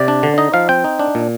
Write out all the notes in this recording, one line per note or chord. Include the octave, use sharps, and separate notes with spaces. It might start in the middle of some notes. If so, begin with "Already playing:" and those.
Already playing: C3 D5
D4
D3
D#4 D#5
F3 F5
C4 G5
D#4
D4
A#2